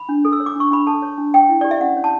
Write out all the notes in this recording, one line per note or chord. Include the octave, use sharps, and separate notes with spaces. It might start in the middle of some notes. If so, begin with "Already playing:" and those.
Already playing: B5
D4
A4
E6
C#5
D6
D4 C#6
D4 B5
A4 A5
C#5
D4
C#5 G5
E4
G4 D5
E5
C#4 F#5
C#5
A5